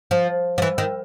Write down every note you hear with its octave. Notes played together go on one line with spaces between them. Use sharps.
F3
F3
E3
D#3